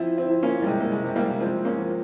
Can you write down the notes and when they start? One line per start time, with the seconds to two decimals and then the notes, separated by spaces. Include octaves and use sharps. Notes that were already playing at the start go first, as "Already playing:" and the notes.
Already playing: F3 C4 E4
0.17 C4 E4
0.30 F3
0.43 A#3 C#4
0.62 G3
0.66 C3 G#3
0.80 A#3
0.92 G#3
1.04 C3
1.16 G3 A#3
1.40 F3 G#3 C4
1.65 A#3 C#4
1.78 F3